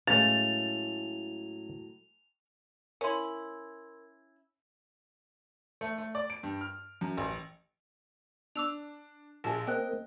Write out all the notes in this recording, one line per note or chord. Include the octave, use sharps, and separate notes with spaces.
A2 F#3 G#3 A3 C#4 F5 A6 F7
C#4 E4 A#4 C6
A3
A3
D5
D7
G2
F6
F#2
A1
D4 D6 E6 F7
A#1 A#2 G#4 A5
A#3 C4 D#5 G5 F#6